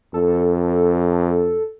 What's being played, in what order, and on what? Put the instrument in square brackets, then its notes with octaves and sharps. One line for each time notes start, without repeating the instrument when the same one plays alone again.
[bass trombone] F2 [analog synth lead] A4